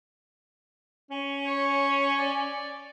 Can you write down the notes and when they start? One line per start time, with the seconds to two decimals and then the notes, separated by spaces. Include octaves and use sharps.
1.11 C#4
1.46 C#5
2.19 D5